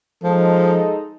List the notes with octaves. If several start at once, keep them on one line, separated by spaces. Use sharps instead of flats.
F3 G#3 D#4 A4